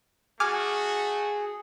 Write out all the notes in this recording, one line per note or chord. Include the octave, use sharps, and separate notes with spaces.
A3 F#4 G#4 G#5 D6 F6